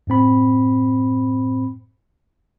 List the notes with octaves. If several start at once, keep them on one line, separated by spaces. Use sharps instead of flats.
F#2 A2 C4 B5